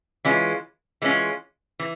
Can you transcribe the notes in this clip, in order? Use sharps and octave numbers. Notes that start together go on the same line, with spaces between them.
E3 G#3 C#4 F4
E3 G#3 C#4 F4
E3